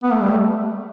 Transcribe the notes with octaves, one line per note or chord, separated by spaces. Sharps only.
B3
A3
G3
A3